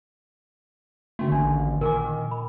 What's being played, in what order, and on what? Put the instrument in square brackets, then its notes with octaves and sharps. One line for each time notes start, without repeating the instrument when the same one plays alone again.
[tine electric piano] D3 D#3 A#3 [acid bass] A3 [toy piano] C#4 F#4
[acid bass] A1 [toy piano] C#4 D4
[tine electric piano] A#2 [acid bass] D#3 [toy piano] A#4 G#5 D6
[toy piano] B5